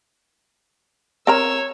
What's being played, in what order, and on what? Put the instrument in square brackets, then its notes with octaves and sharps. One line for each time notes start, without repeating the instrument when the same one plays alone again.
[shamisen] C4 A#4 A#5 [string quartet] C#5 E6